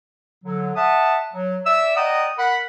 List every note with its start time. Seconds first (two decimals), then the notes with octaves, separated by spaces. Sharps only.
0.44 D3 F#3
0.76 E5 F#5 A5 D#6
1.33 F#3
1.65 D5 E5 E6
1.96 D5 D#5 F#5 G5 A#5 D#6
2.39 A#4 F#5 B5